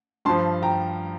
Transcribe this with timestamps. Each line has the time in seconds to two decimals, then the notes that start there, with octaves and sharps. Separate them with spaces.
0.25 G2 F3 A5 C6
0.62 G5 A#5